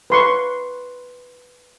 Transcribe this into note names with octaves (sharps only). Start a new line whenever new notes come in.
B4 C6 C#6